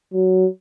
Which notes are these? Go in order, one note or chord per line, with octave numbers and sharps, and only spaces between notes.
F#3